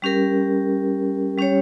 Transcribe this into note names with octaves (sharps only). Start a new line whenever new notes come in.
G3 C#4 G4 A#4
G3 C#4 G4 C#5